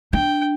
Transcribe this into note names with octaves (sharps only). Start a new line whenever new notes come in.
D4 G5